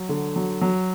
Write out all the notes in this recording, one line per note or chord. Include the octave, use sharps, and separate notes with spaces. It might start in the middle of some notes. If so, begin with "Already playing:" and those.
Already playing: F#3
D3
F#3
F#3